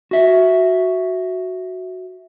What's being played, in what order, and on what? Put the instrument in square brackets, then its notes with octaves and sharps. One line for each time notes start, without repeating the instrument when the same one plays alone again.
[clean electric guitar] F#4 E5